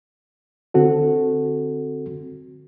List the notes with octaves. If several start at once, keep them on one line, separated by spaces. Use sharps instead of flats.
D3 C4 F#4 A4